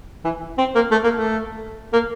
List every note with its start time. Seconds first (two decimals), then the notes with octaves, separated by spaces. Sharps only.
0.24 E3
0.58 C4
0.75 A#3
0.91 A3
1.04 A#3
1.14 A3
1.93 A#3